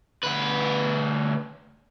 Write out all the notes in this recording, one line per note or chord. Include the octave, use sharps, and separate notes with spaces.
D2 B4